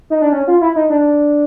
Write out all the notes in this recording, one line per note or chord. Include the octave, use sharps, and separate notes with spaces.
D#4
D4
C#4
F4
E4
D#4
D4